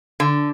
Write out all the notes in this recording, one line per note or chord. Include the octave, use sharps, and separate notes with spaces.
D3